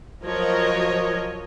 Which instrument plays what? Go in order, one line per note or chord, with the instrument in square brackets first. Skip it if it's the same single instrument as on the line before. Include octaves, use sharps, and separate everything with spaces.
[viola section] F3 F#3 A#4 C#5 D#5